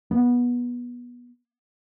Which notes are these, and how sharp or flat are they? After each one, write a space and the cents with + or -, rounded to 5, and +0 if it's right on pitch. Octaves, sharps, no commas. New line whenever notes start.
B3 -20